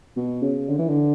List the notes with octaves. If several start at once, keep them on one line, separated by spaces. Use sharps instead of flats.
B2
C#3
D3
E3
D3